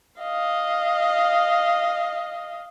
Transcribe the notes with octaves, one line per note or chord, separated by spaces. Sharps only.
D#5 F5